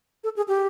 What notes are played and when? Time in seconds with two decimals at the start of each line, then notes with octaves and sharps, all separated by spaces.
0.24 A4
0.37 G#4
0.48 G4